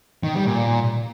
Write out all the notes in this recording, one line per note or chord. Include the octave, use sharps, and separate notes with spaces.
D#3
G3
A#2